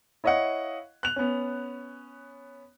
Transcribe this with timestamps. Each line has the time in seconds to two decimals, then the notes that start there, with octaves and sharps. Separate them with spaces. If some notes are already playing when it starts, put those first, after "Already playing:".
0.24 E4 C#5 D#5 F5 F#5
1.03 F#6 F7
1.16 B3 C#4